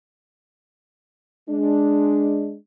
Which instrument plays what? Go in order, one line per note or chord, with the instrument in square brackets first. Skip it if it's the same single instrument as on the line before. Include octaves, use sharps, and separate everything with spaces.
[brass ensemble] G#3 D4